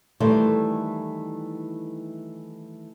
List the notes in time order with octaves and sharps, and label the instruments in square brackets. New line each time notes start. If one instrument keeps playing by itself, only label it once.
[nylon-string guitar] D#3 E3 G3 A3 E4 C5